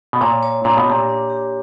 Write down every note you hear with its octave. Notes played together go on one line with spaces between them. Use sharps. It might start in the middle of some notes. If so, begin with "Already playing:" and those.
B2
A#2 C#5
C#5
A#2 D4
B2
A#2 G4
D4
G4